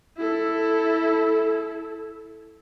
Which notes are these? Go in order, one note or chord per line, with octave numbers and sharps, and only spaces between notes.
E4 A4